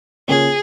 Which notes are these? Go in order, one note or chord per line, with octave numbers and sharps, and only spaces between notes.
C#3 A#3 F4 G#4 C#5